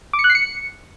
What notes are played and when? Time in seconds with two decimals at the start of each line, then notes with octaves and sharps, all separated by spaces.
0.13 D6
0.19 C#7
0.24 F#6
0.30 C7
0.35 C#7